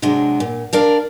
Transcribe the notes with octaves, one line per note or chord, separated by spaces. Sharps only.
C3 F#3 G#3 D4
A#2
D4 A#4 D5 F5